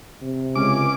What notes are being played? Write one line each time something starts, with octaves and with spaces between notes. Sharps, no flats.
C3
C#2 C#4 D6